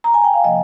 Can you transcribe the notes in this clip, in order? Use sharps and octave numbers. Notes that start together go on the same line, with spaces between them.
A#5
G#5
G5
F5
C3 F3 A#3 D#5